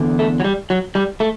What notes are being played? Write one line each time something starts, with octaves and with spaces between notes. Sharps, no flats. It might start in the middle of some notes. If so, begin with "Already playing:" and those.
Already playing: E2 D3
A3
F#3
G3
F#3
G3
A3